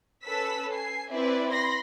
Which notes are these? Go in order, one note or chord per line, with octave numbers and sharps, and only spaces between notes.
C#4 A4 B4 E6 B6
G#5 C7
C4 E4 B4 D5 E5
B5 C6 A#6